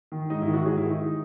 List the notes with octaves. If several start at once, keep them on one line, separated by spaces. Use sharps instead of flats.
D#3
G#2 D#4
E4
D#3
F#4
G#2 G#4
E4
D#3
D#4